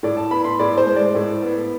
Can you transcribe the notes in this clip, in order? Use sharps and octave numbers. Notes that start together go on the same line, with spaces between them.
A2 D5
A5
B3 B5
C6
A2 D5
C5
G#3
D5
A2
B3